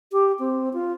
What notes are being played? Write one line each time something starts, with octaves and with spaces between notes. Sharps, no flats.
G4
C4
F4